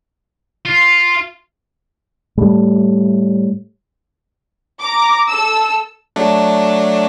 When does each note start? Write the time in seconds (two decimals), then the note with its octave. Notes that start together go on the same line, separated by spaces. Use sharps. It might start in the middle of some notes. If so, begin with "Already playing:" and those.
0.65 F4
2.37 A2 G3 A3
4.81 A#5 D6
5.29 A4 E6
6.16 F#3 A3 D4